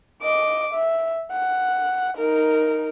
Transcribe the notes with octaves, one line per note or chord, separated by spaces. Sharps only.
D#5 D6
E5
F#5
D#4 A#4